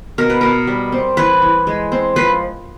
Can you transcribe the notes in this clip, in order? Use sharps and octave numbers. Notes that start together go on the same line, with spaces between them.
B2 A#4
B4
B2 A#4
G3
C4
E3 B4
E3
G#3
C4
F3 B4